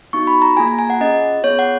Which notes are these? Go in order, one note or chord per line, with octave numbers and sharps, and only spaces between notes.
B3 D#4 F#4 C#6
B5
A#5
A#3 F4 G#4 G#5
A#5
G#5
F#5
C#4 F4 G#4 D#5
B3 F4 G#4 C#5
F#5